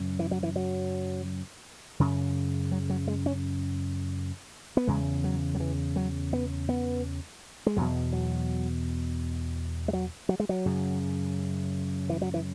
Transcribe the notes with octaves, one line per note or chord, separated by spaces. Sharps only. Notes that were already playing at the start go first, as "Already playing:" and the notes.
Already playing: F#2 C#3
E3
F#3
E3
F#3
F#2 C#3
F#3
F#3
G#3
C#4
B3
E2 C#3 G#3
F#3
F#3
E3
F#3
B3
B3
G#3
E2 B2 F#3
F#3
G#3
F#3
F#3
G#3
F#3
F#2 C#3
E3
F#3
E3